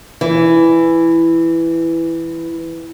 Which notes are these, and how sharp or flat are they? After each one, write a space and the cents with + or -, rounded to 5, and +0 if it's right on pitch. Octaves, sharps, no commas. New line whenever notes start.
E3 +5